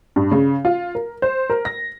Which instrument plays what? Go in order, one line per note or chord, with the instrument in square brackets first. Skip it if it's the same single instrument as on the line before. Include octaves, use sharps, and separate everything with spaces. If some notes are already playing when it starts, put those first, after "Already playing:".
[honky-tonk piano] G2
C#3
F4
A#4
C5
A#4
A#6